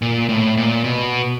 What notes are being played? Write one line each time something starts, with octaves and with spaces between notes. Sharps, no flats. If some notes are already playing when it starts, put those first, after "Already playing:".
A#2
A2
A#2
B2